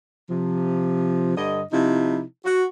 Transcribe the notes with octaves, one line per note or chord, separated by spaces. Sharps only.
C3 F3
G2 D3 D#5
C3 F3 D#4 E4
F#4